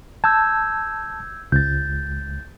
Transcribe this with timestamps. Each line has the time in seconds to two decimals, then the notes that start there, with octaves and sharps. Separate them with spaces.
0.24 A5 E6 G6 G#6
1.52 C#2 G6 A6